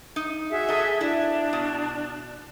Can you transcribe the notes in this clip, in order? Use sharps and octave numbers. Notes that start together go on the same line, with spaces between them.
D#4
F#4 G#4 E5
A4 D#5
D4 E4
B2